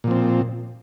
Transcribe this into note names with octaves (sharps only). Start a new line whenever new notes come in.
A#2 F3 C4